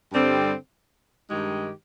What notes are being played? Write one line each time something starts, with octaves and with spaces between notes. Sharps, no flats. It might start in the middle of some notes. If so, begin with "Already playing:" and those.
G2 D3 G3 C4
G2 D#3 G#3 D#4 G4